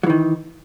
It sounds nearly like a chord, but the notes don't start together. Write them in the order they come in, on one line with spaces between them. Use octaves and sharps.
F#3 E3 D#3